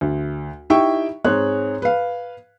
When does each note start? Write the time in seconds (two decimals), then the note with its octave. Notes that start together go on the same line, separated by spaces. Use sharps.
0.01 D2
0.70 D#4 E4 G4 E5 G5 C#6
1.25 G#2 C4 G#4 C#5 F#6
1.82 B4 F5